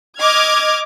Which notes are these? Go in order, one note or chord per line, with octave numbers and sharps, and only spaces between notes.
D#5 D6 F6 G#6